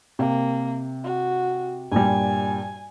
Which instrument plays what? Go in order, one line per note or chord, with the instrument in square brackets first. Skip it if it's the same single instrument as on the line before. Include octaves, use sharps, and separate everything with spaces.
[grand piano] C3 [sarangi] A#3
[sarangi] F#4
[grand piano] G2 A#2 G3 [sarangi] G#5